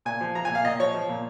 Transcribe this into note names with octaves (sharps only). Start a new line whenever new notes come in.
A#2 G#5
F3
F3 A#5
A#2 G#5
F5
A#2 D#5
F3 C#5
F3
A#2